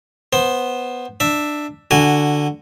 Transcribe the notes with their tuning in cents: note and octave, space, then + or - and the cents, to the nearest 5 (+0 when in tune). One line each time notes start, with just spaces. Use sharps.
B3 +0 C5 +10
D4 +15 E5 +0
D3 +5 F#4 +5 G#5 -15